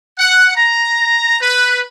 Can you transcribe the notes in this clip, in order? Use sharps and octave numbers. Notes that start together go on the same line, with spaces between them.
F#5
A#5
B4